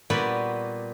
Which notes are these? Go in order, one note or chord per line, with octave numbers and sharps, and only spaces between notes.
A#2 G3 B3 F#4 D5 B5